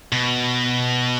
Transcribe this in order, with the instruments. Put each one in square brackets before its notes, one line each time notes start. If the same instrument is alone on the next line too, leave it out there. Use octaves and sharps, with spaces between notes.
[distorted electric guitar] B2